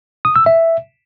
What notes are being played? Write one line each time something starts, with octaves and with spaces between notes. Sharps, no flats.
D#6
E6
E5